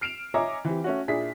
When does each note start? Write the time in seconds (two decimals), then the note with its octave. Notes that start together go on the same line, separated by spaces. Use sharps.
0.01 F6 C7 D7 E7 F7
0.34 C#5 D#5 E5 G#5 A#5 D6
0.65 E3 C4 G4
0.84 A3 C#4 F#4
1.08 A#2 D4 E4 G#4 B6